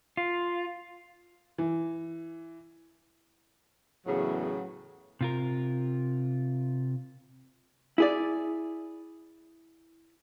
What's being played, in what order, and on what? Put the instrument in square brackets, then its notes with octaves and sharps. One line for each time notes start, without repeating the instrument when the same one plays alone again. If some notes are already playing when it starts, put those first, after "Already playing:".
[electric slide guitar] F4
[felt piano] E3
[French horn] E2 [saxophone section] A2 C#3 F#3
[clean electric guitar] C3 F4 A#4
[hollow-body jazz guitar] E4 G#4 D5